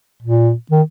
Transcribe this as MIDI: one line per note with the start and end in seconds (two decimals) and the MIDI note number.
0.22 0.53 46
0.71 0.82 51